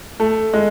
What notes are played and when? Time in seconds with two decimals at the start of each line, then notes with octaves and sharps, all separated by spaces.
0.20 A3
0.54 G#3